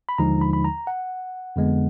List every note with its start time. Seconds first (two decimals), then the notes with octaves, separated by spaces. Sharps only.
0.09 B5
0.18 D#2 D3 F3 G#3 D#4 A#5
0.41 B5
0.53 B5
0.64 A#5
0.87 F#5
1.56 F2 D3 G#3 B3